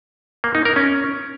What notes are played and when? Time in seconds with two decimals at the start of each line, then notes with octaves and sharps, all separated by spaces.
0.44 A#3
0.55 D#4
0.65 A#4
0.76 C#4